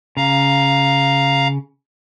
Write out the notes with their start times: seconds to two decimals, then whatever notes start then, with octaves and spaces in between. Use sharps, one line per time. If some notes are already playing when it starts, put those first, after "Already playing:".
0.17 C#3 F5 A#5